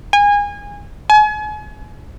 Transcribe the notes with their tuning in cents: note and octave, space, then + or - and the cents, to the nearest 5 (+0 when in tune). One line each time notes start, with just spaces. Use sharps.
G#5 -25
G#5 +35